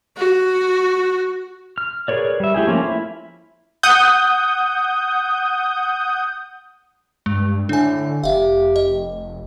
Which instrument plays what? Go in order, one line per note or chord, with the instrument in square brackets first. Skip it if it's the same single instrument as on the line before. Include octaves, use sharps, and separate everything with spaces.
[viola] F#4
[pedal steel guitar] F6
G#4 A#4 B4 C#5 D5
G3 E5
A3 E4 G4 G#4
F3 A3 A#3 C4 C#4
E4
[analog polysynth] F#5 D#6 G6
[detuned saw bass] G2 [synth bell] G#3
[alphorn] A2 [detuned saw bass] D3 [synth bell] D4 G#5
[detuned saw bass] F1 [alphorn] G4 [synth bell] E5 F5
[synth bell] D#5